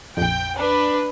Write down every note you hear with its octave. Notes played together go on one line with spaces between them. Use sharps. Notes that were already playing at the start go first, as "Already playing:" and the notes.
A#1 F2 G5
D4 B4